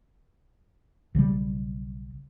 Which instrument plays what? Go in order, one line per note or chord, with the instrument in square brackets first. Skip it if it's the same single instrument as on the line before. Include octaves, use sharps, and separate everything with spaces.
[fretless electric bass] B1 C#3 F#3 G3